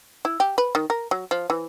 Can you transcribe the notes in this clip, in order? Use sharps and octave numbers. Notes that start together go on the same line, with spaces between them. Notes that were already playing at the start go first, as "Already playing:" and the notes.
E4
G4
B4
D#3
A#4
F#3
F3
E3